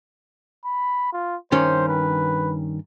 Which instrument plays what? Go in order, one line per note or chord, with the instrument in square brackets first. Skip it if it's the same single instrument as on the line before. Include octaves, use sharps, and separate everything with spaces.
[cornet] B5
F4
[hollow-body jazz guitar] G2 D#3 C#4 [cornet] C5
[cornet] B4